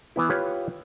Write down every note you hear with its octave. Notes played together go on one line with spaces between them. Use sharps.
E3 B3 E4
F4 G4 B4 C#5